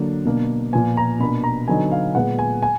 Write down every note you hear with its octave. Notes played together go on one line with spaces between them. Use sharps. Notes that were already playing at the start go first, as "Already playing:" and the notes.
Already playing: D3 F#3 A#3 D4
B2 A#3 D4
A#2 F3 B3 G#5
A#5
B2 A#3 D4 B5
A#5
D3 F#3 B3 D#4 G#5
F5
A#2 G#3 B3 F#5
G#5
G#5